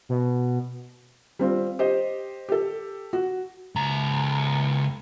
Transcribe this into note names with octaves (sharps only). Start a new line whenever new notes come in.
B2
G3 C4 F4
G4 C5 D#5
G4 A4
F#4
C#2 A#5